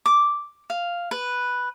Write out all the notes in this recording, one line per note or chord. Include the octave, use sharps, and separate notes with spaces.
D6
F5
B4